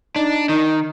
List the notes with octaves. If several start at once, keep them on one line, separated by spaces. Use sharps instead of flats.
D4 D#4
D#3 D#4